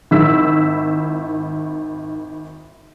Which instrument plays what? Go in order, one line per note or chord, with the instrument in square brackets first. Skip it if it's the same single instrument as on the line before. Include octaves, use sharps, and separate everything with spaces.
[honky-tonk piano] G#1 D#3 E4 E6 B6